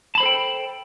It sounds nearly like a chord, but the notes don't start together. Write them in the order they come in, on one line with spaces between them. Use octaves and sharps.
A5 B5 C5 A4 G5